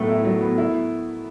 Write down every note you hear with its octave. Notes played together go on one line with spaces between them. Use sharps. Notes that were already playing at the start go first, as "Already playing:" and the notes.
Already playing: A2 F#3 A3 B3
E4
F#3
B3
E4